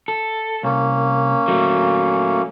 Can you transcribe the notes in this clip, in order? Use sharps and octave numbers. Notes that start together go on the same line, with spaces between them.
A4
C2 A#3 C#4
F#3 A3